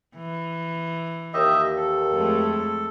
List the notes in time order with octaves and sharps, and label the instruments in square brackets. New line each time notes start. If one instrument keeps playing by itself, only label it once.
[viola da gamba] E3
[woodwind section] D#2 [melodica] G4 D#5 E5
[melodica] A4
[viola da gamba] F2 G#3 A3